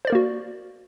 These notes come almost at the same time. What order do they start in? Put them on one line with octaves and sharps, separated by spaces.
C5 D5 A#4 A#3 F#4